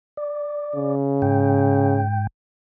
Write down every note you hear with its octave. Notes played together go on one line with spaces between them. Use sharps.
D5
C#3
G#2 G5